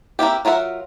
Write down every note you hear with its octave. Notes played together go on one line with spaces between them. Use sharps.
A#3 C4 E4 G4
F#3 F4 A#4 E5 F#5